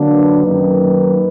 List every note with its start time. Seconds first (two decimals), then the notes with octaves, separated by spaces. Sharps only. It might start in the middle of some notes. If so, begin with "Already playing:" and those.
Already playing: D3 F#3 A#3 D4
0.09 B4
0.45 F#2 D#3 A#3 D#4